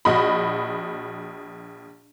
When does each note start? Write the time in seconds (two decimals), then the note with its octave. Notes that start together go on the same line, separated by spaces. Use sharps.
0.05 A#1 F#4 D#5 B5